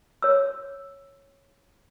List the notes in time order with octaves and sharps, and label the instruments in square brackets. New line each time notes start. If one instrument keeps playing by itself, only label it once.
[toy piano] C#5 E6